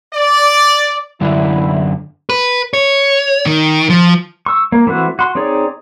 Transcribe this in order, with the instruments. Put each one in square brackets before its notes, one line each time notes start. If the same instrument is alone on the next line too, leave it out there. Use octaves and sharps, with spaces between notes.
[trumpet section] D5
[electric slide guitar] F#2 D3 D4 [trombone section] E4
[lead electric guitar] B4
C#5
D#3
F3
[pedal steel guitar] C#6 E6
A#3
E3 A3 C4 F#4
F#4 C6
C4 D#4 G#4 C#5 D5